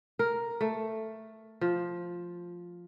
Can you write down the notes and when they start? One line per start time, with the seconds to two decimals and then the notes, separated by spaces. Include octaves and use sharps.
0.19 A#4
0.61 A3
1.61 F3